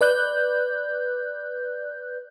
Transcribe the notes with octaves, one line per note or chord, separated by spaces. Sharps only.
B4 D5 F#6 G6